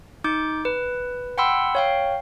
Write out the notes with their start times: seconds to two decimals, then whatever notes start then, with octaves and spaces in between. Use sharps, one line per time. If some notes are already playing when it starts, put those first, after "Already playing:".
0.24 D#4 D6 G6
0.65 B4
1.38 F#5 G5 B5 C6 E6
1.75 C#5 F5 G5